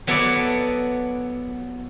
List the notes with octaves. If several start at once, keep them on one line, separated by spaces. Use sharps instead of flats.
F#3 B3 E4 A4 D5